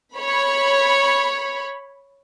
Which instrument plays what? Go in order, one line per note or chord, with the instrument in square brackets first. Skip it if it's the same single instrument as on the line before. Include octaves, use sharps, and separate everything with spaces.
[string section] C#5 B5